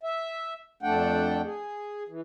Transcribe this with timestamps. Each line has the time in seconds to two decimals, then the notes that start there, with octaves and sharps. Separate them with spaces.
0.03 E5
0.83 F2 A3 D4 F#5 G5
1.44 G#4
2.09 E3